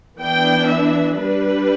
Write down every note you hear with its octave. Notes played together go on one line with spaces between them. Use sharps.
E3 B3 D4 G5
E5
G3 D4 B4